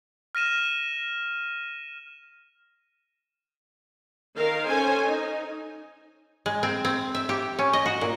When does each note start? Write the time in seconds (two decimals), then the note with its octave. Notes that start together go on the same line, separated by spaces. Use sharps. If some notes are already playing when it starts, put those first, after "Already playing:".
0.35 F6 A#6 D#7 E7
4.37 D#3 A#4 F5
4.67 C#4 A4 C5 G#5
5.06 D#4
6.46 G#3
6.63 C4
6.85 C4
7.15 E5
7.29 G4
7.59 C#4
7.73 D#5
7.86 F#4
8.01 A#2